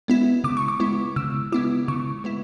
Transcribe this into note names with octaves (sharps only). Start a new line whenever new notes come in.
G#3 B3 E4
C#3 D6
C#6
D6
G#3 B3 E4
C#3 E6
G#3 B3 E4 D6
C#3 C#6
G#3 B3 E4